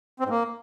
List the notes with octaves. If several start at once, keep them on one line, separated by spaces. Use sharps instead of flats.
C4
G#2
A#3